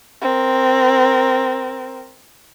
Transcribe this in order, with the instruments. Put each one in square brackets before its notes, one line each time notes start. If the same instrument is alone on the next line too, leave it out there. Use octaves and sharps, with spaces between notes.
[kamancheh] C4 A#4